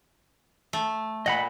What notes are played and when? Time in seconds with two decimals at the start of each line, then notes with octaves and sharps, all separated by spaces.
0.73 A3
1.26 A#2 D#5 F#5 B5